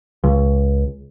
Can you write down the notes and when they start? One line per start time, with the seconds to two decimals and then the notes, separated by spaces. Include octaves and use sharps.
0.24 C#2